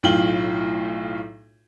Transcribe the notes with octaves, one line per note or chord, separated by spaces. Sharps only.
B1 A2 F4 G5 F#7 G7